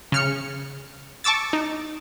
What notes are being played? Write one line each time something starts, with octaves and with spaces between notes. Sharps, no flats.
C#3 F6 C#7
A5 C#6 D6 E6 A6
D#4